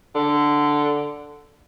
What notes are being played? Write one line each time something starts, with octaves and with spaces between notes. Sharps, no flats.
D3